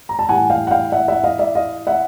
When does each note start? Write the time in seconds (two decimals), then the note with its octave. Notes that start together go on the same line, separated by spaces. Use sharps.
0.09 A#5
0.19 A5
0.29 A2 E3 G3 F#5 G#5
0.50 F5 G5
0.67 F#5
0.71 F5 G5
0.92 E5 F#5
1.08 E5 F#5
1.24 D#5 F5
1.39 D5 E5
1.55 D#5 F5
1.87 E5 F#5